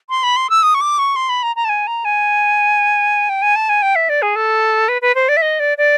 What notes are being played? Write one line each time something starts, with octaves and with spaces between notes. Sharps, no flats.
C6
B5
C6
E6
D#6
C#6
D6
C#6
C6
B5
A#5
A#5
A5
G#5
A#5
G#5
G5
G#5
A5
G#5
G5
E5
D5
G#4
A4
B4
B4
C5
D5
E5
D#5
D5
D5